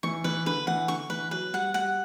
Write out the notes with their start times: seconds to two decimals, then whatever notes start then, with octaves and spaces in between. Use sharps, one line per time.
0.03 E3 C#6
0.24 E3 B4
0.46 D3 B4
0.67 E3 F#5
0.88 D3 C#6
1.10 E3 B4
1.31 F#3 B4
1.53 G3 F#5
1.74 G3 F#5